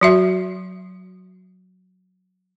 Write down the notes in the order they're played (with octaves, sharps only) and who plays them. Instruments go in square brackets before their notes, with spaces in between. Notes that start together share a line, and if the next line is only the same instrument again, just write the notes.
[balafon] F#3 F#4 E5